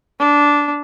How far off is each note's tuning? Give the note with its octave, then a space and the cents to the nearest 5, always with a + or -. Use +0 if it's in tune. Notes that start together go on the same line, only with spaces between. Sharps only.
D4 -10